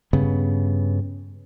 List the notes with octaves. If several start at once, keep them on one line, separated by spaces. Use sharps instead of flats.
G2 C#3 B3